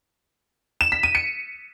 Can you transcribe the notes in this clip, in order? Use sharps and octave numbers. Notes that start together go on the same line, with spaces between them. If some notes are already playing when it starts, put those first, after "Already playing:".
E7
B6
D#7
C#7